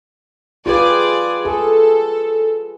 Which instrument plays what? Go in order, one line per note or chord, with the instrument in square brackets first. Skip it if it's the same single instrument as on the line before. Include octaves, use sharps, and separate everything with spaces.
[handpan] F4 G4 B4 [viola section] G#4 D5
[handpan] G#4 [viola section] A4